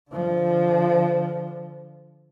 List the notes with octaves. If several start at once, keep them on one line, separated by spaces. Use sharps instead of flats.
D3 F3